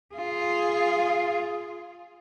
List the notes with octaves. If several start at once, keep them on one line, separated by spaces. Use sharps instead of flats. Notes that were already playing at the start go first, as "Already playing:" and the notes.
F4 G#4